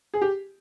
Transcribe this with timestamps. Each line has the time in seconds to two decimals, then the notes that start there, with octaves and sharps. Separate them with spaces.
0.14 G#4
0.21 G4